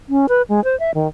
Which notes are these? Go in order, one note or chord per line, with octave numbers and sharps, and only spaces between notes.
C#4
B4
G#3
C5
E5
D#3